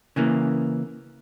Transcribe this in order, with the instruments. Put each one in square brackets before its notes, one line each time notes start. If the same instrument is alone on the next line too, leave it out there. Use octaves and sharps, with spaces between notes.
[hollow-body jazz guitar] C#3 E3 A#3